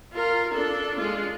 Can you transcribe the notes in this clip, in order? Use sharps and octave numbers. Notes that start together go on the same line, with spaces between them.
F4 A#4
D4 A4
G#3 F4